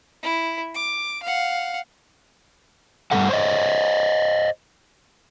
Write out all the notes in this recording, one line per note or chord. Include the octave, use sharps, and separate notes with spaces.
E4
D6
F5 F#5
G2 F3 G3 A3 A4 F#5
C5 C#5 D#5